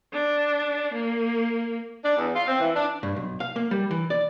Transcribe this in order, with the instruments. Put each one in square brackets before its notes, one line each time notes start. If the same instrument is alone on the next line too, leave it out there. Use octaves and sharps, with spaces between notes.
[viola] D4
A#3
[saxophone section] D4
E2
F4
C4
E3
D4
[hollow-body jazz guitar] G2
B1
F5
A#3
G3
E3
D5